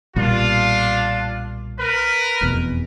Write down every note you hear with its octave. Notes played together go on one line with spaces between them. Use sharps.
B1 A#2 G3 D4 F4
A#4 B4
F1 E2 B2